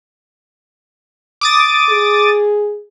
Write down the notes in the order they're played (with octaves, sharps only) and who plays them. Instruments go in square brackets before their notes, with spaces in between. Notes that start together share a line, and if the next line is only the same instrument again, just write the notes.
[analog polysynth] D6 D#6 A6
[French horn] G#4